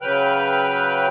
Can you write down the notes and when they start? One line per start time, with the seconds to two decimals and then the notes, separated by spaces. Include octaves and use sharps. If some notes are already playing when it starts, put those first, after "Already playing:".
0.02 C#3 F#3 B4 G5 F6 F#6